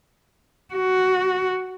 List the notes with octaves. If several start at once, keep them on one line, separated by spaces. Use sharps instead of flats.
F#4